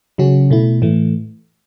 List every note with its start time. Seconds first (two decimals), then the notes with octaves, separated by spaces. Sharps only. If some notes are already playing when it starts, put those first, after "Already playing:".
0.18 C#3 F#3 C#4 F#4
0.50 B2 A3 E4
0.82 A2 E3 A3